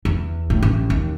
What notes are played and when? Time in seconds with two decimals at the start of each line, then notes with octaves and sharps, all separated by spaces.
0.05 E2
0.50 A2
0.63 A1
0.90 D#2